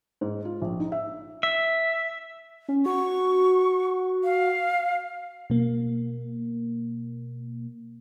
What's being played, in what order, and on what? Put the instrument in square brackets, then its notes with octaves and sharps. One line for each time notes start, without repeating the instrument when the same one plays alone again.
[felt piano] G#2
F4
A#1
D#4
E5
[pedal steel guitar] E5
[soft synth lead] C#4
[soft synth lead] F#4 [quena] C#6
[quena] F5
[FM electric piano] B2 A#3